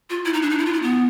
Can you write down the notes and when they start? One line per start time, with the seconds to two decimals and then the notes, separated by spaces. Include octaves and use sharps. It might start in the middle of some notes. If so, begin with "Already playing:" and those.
0.10 F4
0.25 E4
0.34 D#4
0.42 D4
0.50 D#4
0.58 E4
0.66 F4
0.73 E4
0.82 B3